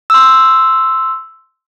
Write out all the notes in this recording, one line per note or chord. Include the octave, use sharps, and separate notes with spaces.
C6 E6